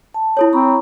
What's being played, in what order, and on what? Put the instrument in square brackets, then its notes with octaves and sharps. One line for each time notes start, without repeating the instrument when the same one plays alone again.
[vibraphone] A5
[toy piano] E4 A4 C#5
[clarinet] C4 [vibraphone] A#5 B5 C#6